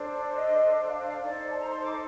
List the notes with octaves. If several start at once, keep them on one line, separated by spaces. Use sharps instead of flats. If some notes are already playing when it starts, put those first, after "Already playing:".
Already playing: D4 A4 C5
D5
D#5
F5
D#5
F5
D#4 A4 C5 D5
A5
A#5
C6
D6